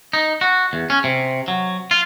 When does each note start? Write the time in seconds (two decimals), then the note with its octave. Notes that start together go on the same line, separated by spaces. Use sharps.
0.13 D#4
0.41 F#4
0.73 E2
0.90 C#4
1.04 C3
1.48 F#3
1.91 F4